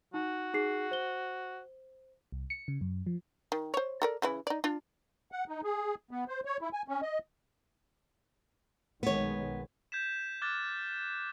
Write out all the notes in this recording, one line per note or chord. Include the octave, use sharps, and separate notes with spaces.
D#4 F#4
D#4 G#4 C7
C5 G7
C2
C#7
C#3
F#2
F3
D#3
C5 C#5
A4 A#4 D5
C#3 E3 E4
D#4 D5
D4 F4
F#5
D#4
G#4
B3
C5
C#5
E4
G#5
C#4
D#5
B1 D#3 G#3 B3 C#5
G6 G#6 B6 E7
D6 F6 F#6 G#6 A6